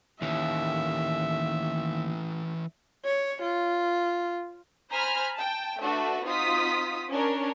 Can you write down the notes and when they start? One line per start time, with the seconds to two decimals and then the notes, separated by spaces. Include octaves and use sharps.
0.22 D#2 E3 C#4 E5
3.05 C#5
3.42 F4
4.89 C5 G#5 A#5 B5 F6 B6
5.37 G5 A5
5.81 A3 D4 F#4 A4 B4
6.25 C4 D#4 F4 F#4 D#6 B6
7.09 C#4 D4 A#4 C#5